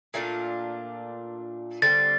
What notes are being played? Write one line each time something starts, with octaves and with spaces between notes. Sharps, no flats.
A#2 A3 D4 F4
D3 G3 C4 A6